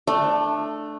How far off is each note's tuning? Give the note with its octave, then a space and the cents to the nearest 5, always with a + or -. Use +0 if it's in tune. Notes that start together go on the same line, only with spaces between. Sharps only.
A3 +0 D4 +20